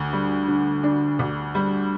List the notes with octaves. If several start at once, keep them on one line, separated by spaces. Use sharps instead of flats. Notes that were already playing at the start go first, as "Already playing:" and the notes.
Already playing: D2 D3
G3
D3
D4
D2
G3